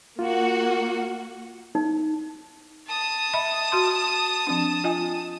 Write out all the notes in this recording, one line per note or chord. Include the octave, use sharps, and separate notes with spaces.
A#3 F4 F#4
D#4
A5 D#6
D#5 E5 B5
F#4 C6
F3 C4 D4
F4 D#5 G#5